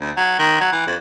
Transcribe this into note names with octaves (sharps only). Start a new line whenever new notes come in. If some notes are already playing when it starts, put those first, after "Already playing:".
D2
F#3
D#3
F#3
E3
F2